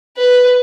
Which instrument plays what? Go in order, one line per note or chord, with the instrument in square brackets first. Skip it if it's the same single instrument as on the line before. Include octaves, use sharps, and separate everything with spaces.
[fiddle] B4